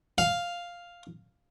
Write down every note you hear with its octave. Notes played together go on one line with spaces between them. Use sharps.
F5